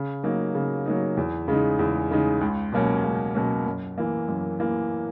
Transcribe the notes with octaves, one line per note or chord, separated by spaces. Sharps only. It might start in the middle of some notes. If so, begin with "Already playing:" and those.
Already playing: C#3
F#3 A#3 D#4
C#3
F#3 A#3 D#4
E2
C#3 G#3 D#4
E2
C#3 G#3 D#4
C#2
B2 F#3 A#3 C#4
C#2
B2 F#3 A#3 C#4
F#2
E3 A#3
F#2
E3 A#3